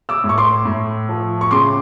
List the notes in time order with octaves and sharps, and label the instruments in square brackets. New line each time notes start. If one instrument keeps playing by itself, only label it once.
[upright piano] D6 E6
A2
C#6
C6 D6
A2
F3
C#6
C#3 C6 D6